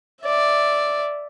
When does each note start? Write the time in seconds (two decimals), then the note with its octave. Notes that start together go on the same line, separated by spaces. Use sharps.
0.22 D5 E5